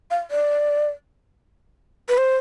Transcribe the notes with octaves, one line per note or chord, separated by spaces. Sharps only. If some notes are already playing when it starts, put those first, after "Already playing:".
F5
D5
B4
C5